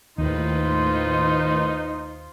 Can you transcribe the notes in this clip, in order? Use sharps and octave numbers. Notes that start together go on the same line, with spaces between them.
D#2 A2 D#3 D#4 F4 B4 C5